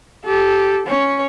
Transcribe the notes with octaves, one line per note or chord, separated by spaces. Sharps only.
G4 A4
C#4 C#5